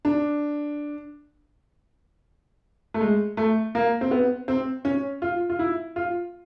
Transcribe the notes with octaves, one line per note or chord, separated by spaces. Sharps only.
D4
A3
G#3
A3
A#3
C4
B3
C4
C#4
F4
F4
E4
F4